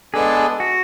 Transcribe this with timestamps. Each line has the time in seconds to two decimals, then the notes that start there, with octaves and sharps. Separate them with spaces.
0.14 G#3 B3 D4 G#4 A4
0.60 F#4